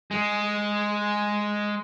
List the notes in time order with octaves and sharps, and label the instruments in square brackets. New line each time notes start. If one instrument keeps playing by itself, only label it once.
[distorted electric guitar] G#3